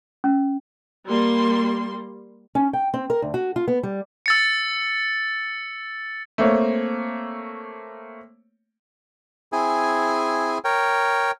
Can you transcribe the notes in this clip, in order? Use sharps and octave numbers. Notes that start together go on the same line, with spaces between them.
C#4
G3 A#3 C6
C#4
G5
C4
A#4
D2
F#4
F4
B3
G3
E6 A6 C#7
A3 A#3 C4 C#5
C4 E4 G#4 G#5
A#4 C#5 G5